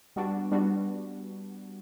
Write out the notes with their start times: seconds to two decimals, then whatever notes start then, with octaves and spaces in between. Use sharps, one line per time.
0.16 G3 B3 D4 F#4
0.51 G3 B3 D4 F#4